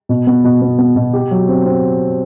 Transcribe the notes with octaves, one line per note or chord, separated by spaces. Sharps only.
B2
B3
B2
B3
B3
B2
G4
F#3
C4
C4